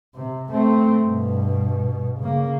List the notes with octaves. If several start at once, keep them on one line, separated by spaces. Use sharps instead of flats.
C3
A3 C4
G2 B2
C#3 A#3